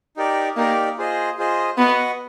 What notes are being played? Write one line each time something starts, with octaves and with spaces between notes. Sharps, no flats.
D#4 G4 A#4 D5
A#3 D#4 G4 A#4 D5
F4 G#4 C5 D#5
F4 G#4 C5 D#5
B3 F#4 B4 D#5 F#5